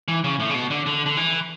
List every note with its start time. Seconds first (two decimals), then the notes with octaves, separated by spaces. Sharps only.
0.08 E3
0.24 C#3
0.40 A2
0.50 C#3
0.55 B2
0.70 D3
0.86 D3
1.06 D3
1.17 E3